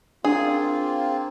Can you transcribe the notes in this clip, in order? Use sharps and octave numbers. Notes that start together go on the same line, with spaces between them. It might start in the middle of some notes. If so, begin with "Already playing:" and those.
A#3 C4 D4 F4 G#4